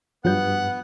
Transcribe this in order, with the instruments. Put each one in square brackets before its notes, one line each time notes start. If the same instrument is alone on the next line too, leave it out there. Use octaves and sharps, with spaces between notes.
[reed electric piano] G2 [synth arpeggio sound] F3 F#3 G6 [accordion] B3 [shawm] F#5